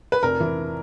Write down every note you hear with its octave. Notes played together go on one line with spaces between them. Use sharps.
B4
F1 A#4
E3